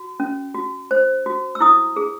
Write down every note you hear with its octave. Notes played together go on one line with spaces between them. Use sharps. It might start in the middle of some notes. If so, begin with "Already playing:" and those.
Already playing: F#4
C#4
F#4
C5
F#4
E6
E4 D#6
G#4